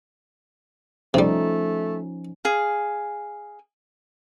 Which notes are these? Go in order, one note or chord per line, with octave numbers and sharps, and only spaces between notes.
C3 F3 G3 A3 C#4 D#4
G#4 F5